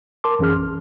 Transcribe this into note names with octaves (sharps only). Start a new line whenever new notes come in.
A#4 A5 C6 D6
F#2 E3 C#4 G#4 F6
A#1